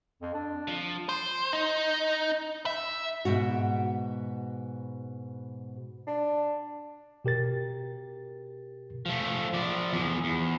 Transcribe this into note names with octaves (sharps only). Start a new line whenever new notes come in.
F2
D4
F3
C5
D#4
E5
G#2 B2 F#4
D4
B2 G4 A#4 A6
F3 A3
F3 D5
E2 F3
E2